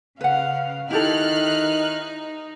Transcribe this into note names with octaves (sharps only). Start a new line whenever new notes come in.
C#3 B4 F5 F#5
D#3 D#4 E4 G4 A4 F6 F#6